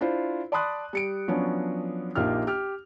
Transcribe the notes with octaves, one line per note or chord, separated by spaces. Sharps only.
D4 E4 F4 C5
D5 A5 B5 C6 D#6 F#6
G3 C#7 D7
F3 F#3 B3 C#4 D4
A#1 A#3 D#4 F4 G4 F6
G4 F6